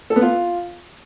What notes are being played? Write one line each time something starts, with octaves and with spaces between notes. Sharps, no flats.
A4
B3
F4